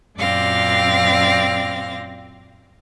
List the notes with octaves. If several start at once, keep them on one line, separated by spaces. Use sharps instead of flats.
F#2 A#2 C4 D5 F5 A#6